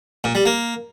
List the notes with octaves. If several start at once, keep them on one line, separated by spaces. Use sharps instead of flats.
A#2
G3
A#3